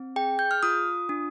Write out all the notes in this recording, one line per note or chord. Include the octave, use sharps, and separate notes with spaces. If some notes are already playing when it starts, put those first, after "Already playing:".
Already playing: C4
G#4 G5
G6
F6
F4 D#6
D4